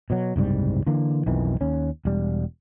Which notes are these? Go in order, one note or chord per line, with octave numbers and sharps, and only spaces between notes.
B2 F#3
F#1 C2 G#2 G3
D3 E3 A#3
B1 F2 D#3 E3
D#2 C#4
E1 G3